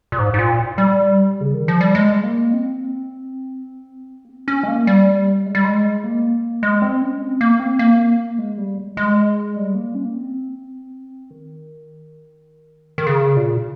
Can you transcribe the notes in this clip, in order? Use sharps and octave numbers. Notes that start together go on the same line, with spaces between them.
A#2
G#2
G#2
A#2
G3
C#3
D#3
F3
G3
G#3
A#3
C4
A#3
C4
C#4
G#3
A#3
G3
G#3
G3
G#3
A#3
G#3
C4
C#4
C4
A#3
C4
A#3
G#3
G3
G#3
G3
A#3
C#4
A#3
C4
D#3
D#3
C#3
A#2